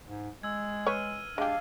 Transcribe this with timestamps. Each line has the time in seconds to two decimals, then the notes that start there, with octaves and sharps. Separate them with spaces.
0.05 G#2
0.43 G#3 E6 G#6
0.86 B4 C#5 F6 D#7
1.38 G#3 D4 G4 F5